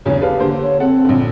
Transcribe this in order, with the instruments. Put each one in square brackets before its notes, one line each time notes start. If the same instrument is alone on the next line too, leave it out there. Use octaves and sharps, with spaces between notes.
[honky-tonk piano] B1 E2 C#3 [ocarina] C#5
[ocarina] G4 [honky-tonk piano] A4 B4 F5
[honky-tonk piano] D3 A#3 C5
[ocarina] C#5
[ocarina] C4 [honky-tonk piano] A4 F#5
[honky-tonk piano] A#1 D3